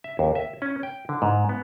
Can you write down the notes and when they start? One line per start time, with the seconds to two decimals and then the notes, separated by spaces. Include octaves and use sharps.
0.04 E5
0.19 D#2
0.35 E5
0.62 C#4
0.83 G5
1.09 D3
1.22 G#2
1.49 B3